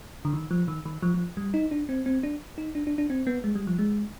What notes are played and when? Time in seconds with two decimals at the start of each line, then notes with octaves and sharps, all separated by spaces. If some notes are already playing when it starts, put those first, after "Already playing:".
0.25 D3
0.33 D#3
0.51 F3
0.68 D#3
0.86 D#3
1.02 F3
1.14 F3
1.37 G3
1.54 D#4
1.71 D4
1.89 C4
2.06 C4
2.23 D4
2.58 D#4
2.75 D4
2.87 D4
2.98 D4
3.10 C4
3.27 B3
3.44 G#3
3.55 G3
3.67 F3
3.79 G#3